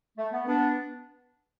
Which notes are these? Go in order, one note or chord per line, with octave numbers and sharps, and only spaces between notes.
A3
B3
B3 D4